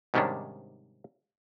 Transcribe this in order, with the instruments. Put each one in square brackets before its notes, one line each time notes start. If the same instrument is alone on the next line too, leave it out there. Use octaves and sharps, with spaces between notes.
[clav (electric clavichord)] G#2 C3 D#3 G3 C#4 D4